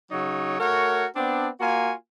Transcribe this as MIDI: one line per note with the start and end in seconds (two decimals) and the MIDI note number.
0.11 0.56 49
0.11 0.56 54
0.11 0.56 63
0.11 0.56 73
0.60 1.06 57
0.60 1.06 66
0.60 1.06 70
0.60 1.06 73
1.16 1.48 59
1.16 1.48 60
1.16 1.48 62
1.60 1.93 58
1.60 1.93 65
1.60 1.93 66
1.60 1.93 80